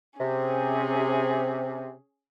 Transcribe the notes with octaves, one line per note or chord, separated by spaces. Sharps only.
C3 C#4 G#4